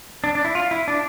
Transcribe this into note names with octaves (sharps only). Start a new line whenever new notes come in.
D4
D4
E4
F4
E4
D4